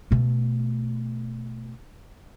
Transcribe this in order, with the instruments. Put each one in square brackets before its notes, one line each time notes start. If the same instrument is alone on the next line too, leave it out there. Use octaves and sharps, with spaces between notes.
[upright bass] B2 A3